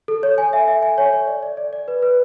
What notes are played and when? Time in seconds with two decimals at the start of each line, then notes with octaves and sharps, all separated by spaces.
0.08 A4
0.23 C#5
0.38 G#5
0.53 E5
0.68 E5
0.83 G#5
0.98 C#5
1.13 C#5
1.27 D5
1.43 D5
1.57 D5
1.73 D5
1.88 B4
2.02 B4